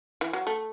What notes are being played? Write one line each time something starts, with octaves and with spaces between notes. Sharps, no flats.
E3
F#3
A3